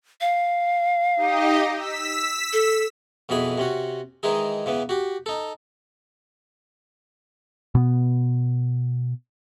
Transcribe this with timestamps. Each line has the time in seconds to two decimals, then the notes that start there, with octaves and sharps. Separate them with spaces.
0.21 F5
1.16 D#4 G4 D#5
1.76 E6 B6
2.53 A4
3.29 F2 B2 E3 G#4 B5
3.58 C3 C#4 F#4
4.23 D#3 E3 G#3 D#4 G#4
4.66 C#3 E3 B3
4.89 F#4 G4
5.26 D#4 A4
7.75 B2 B3